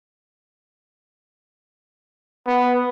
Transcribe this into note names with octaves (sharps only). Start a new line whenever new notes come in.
B3